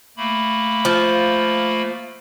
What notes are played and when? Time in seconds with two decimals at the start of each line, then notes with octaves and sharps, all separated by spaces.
0.17 A3 A#3 B5
0.85 F3